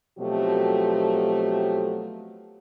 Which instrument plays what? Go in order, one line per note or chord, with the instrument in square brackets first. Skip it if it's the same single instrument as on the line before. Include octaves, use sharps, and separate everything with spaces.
[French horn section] B2 F3 F#3 A3 C4 G4